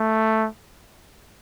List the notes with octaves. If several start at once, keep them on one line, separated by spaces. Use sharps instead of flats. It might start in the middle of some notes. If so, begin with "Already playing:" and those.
Already playing: A3